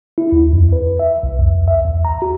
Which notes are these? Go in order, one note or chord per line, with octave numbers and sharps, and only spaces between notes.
E4
D#2
F2
B4
E5
C2
F2
E5
E2
A#5
F#4